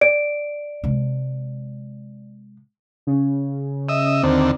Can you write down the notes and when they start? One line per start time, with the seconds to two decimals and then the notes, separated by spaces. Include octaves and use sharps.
0.01 D5 D7
0.84 C3 G#3
3.07 C#3
3.89 D#5 E5
4.23 D#2 D3 C4